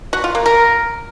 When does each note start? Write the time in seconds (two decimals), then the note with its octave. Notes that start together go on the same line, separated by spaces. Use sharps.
0.13 F#4
0.24 F4
0.35 A#3
0.46 A#4